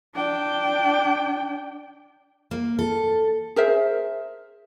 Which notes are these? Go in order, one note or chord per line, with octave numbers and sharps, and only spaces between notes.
D4 G5
A#3
A4
G#4 A#4 C5 E5